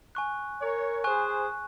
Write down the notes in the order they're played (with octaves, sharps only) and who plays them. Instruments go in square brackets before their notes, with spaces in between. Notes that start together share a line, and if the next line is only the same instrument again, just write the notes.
[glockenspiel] G#5 C#6 F#6
[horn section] A#4 C#5
[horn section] G#4 C5 [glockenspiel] G#5 C#6 F#6